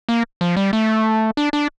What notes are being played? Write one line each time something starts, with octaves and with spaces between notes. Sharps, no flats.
A#3
F3
G3
A3
D4
D4